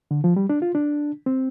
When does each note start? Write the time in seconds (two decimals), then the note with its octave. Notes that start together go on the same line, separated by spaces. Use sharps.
0.11 D3
0.24 F3
0.36 G3
0.49 D4
0.62 F4
0.75 D4
1.26 C4